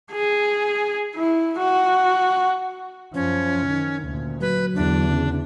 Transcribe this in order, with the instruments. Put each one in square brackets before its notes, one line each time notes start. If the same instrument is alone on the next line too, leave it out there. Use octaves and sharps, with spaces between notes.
[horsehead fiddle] G#4
E4
F#4
[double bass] F#2 F3 [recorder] C#4
[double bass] D#3
D2 A#2
[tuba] F#3 [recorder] B4
[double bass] E2 D3 [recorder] D4
[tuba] C#3